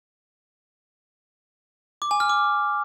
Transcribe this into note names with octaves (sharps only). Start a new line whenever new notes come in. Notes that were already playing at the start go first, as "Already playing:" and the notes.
D6
G#5
F6
D6